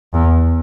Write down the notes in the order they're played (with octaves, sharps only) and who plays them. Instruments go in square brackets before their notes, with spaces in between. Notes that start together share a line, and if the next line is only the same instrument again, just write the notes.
[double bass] E2